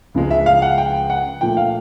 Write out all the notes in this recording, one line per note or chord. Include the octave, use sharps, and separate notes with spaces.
C#2 C#3 F3 G#3
E5
F5
F#5
G5
F#5
A#2 F3 A3 G5
F5